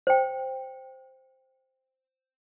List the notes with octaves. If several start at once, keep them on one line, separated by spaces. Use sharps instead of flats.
C5 G5